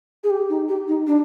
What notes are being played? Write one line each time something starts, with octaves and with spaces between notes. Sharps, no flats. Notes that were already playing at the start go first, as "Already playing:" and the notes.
G#4
G4
D#4
G4
D#4
D4